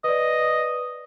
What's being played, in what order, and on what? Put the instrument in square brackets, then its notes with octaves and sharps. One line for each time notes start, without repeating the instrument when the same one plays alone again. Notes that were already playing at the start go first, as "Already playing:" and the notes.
[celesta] B4 D5 [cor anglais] D#5